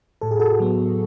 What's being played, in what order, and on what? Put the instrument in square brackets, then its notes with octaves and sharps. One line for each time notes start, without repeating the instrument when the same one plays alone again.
[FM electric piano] A2 A4
G#4
F#4 A4
F#3 B3